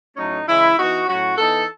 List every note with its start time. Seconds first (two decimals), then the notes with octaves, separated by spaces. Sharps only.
0.16 A2 F#3 A3 C#4 D#4
0.46 C#3 E3 G#3 C#4 E4
0.78 E3 B3 D#4 F#4
1.08 A2 F#3 C#4 F#4
1.38 E3 B3 D#4 A4